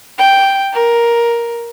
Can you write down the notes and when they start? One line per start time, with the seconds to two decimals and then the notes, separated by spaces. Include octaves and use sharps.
0.18 G5
0.74 A#4